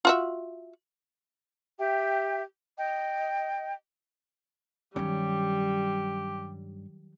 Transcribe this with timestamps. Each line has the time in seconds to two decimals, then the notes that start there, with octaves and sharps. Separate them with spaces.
0.05 F4 F#4 E5
1.79 G4 E5 G5
2.78 D#5 G5
4.96 G2 D#3 F#3 G3 C#4 G4 C#5